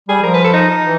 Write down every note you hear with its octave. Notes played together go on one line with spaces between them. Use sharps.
G3 G#4
F3 A#4
B4
A4
D#4
E3